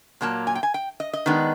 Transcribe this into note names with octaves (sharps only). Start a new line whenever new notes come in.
A#2 F#3 A#3 A5
G#5
G5
G#5
G5
D#5
D#5
D#3 G#3 B3 D4